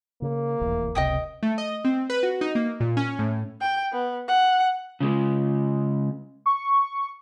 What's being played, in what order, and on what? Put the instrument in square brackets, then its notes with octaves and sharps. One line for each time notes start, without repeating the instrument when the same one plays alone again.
[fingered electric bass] C#3 [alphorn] A#3
[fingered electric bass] F1 B1 E2
[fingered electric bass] F#1 C#2 C3 [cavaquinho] D#5 G5 D#6
[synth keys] A3
D#5
C4
B4
F#4
D#4
A#3
A#2
C#4
A2
[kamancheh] G5
B3
F#5
[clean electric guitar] C#3 G#3
[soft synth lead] C#6